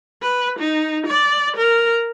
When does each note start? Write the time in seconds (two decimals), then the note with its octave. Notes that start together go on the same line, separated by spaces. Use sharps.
0.22 B4
0.59 D#4
1.06 D5
1.57 A#4